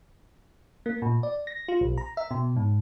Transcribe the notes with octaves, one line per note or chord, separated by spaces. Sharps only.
A#3
A#2
D5
A#6
F4
B1
A#5
E5
B2
G#2